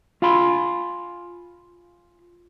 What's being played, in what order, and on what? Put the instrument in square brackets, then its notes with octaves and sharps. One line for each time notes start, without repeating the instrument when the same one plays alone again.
[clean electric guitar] F4 F5 G#5 B5 C6